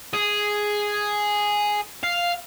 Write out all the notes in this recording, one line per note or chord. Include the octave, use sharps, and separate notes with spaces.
G#4
F5